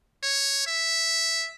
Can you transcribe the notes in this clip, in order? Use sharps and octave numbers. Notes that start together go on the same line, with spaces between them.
C#5
E5